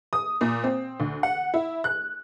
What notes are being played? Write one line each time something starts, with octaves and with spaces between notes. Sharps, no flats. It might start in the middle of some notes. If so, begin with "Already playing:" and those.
D#6
A#2
C4
D2
F#5
E4
F#6